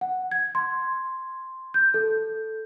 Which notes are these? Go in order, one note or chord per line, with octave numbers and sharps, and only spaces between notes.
F#5
G#6
C6
G6
A4